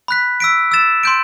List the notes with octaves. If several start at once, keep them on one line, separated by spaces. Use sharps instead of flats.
B5 F#6 B6
E6 B6 D7
E6 A6 E7
C6 G6 D7